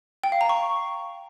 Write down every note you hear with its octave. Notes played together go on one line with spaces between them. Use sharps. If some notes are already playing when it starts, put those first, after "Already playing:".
G5
F5
A#5
C#6